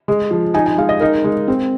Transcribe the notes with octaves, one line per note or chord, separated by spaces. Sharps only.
G#3
F3
D#4 G#5
G#5
G#3 F5
D#5
D#4 A#4
G#3
C4